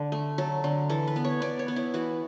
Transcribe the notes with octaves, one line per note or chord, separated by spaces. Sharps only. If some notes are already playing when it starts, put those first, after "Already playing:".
Already playing: D3
A3
F#3 A4
D3
E3 A4
B4
B3
C#5
B3 D5
C#5
B3
E4
E3 F#4